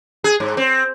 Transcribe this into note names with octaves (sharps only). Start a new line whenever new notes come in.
G#4
G#2
C4